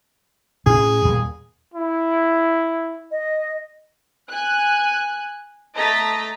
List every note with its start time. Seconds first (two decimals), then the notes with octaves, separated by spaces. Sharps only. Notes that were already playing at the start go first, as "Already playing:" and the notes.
0.66 A2 C#4 G#4
1.05 D#2 A#2 G3
1.74 E4
3.11 D#5
4.28 G#5 F#6
5.75 A3 D#5 A#5 A6 B6